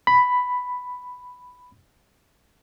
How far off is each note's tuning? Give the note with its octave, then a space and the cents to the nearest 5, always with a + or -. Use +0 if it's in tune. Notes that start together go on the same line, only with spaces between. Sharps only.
B5 +5